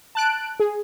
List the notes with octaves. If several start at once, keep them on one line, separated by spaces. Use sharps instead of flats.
A5 F#6 D7
G#4